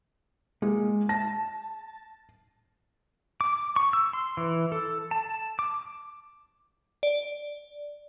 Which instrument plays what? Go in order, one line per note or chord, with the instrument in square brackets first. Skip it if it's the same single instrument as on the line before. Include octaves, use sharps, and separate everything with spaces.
[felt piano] G#3 [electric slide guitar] A#3
[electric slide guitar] A5 [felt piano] A#6
[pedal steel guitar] D6
C#6
E6
C6
E3
A4
A5
D6
[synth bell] D5